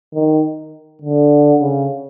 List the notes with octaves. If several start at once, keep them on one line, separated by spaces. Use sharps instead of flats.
D#3
D3
C#3